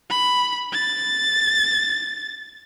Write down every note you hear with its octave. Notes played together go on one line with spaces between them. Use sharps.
B5
A6